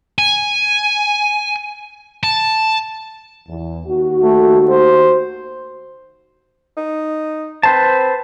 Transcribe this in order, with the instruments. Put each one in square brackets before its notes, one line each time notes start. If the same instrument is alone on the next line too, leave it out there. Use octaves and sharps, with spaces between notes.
[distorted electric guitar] G#5
A5
[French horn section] E2
D#2 F#4
[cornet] A3
C5
[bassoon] D#4
[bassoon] C4 [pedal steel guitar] B4 C5 A5